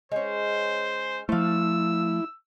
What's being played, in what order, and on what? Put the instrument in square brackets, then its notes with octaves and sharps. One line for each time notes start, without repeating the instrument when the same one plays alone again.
[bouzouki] G#3 C#4 [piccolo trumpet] C5
[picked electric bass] F3 A3 [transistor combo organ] E4 [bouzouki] C5 F5 [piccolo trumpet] E6